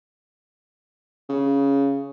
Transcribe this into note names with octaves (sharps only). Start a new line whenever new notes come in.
C#3